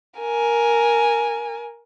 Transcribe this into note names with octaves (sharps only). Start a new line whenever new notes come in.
A#4 G#5